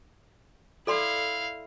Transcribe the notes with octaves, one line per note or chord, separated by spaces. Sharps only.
E4 A4 D5 F5 C6